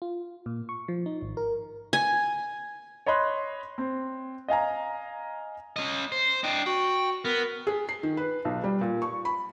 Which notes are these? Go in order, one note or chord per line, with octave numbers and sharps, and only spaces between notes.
F4
A#2
C#6
F3
D#4
G#1
A#4
G#5
C#5 D#5 B5 C6 F#6
C4
D#5 F5 G#5 A#5
C#4 D#5
C5
D4 D#5 G5
F#4 G5
B3 A#4
G#4
C7
D#3
B4
B1
G3
A#2
C#6
B5